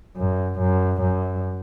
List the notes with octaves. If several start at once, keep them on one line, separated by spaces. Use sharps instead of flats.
F#2
F#2
F#2